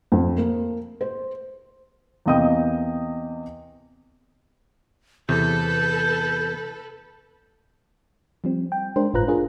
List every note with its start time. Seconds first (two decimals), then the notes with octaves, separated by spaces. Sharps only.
0.12 F2
0.38 A#3
1.01 C5
2.26 E2 C3 A#3 D#5 G5 D#6
5.29 E2 C3 A4 B4 G6
8.44 F3 G3 C4
8.72 G5
8.96 G#3 D4 A#4 C5
9.13 G1 A2 F4 B4 A#5 F#6
9.28 D4 F4 G#4 A#4